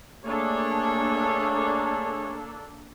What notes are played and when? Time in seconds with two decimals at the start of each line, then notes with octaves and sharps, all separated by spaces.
0.25 A3 A#3 D4 G#4 A4 C#5